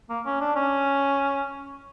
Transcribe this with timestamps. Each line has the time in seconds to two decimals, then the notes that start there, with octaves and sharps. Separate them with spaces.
0.10 A#3
0.26 C#4
0.41 D4
0.56 C#4